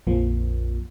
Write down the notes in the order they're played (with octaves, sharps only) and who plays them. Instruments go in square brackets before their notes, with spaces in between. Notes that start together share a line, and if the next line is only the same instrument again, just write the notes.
[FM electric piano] A#1 F2 F3 A#3